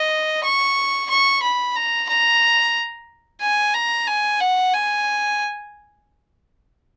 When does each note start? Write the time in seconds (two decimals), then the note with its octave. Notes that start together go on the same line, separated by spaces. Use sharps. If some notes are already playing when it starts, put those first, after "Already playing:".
Already playing: D#5
0.44 C#6
1.10 C#6
1.43 B5
1.76 A#5
2.09 A#5
3.41 G#5
3.74 A#5
4.07 G#5
4.40 F#5
4.73 G#5